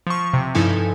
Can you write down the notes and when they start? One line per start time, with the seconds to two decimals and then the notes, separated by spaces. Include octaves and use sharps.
0.07 F3 C#6
0.33 C3
0.55 G2 F3 D#4 E4 A4 G#5